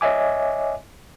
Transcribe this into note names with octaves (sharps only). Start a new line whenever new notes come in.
C#5 D#5 E5 G#5 D6